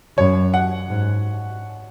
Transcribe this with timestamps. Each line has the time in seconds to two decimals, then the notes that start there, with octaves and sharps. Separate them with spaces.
0.17 F#2 C#5
0.54 F#5
0.89 G#2